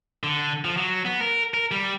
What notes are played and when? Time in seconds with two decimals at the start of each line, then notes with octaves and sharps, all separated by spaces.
0.24 D3
0.65 F3
0.77 F#3
1.05 B3
1.21 A#4
1.54 A#4
1.71 G3